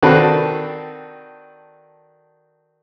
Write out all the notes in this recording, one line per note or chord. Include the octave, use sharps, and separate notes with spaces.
D#3 C4 D4 F#4 A4 B4